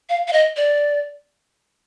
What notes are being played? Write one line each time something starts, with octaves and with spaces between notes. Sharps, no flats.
F5
F5
D#5
D5